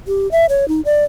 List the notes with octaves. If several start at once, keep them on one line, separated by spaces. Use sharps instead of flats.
G4
E5
C#5
D#4
D5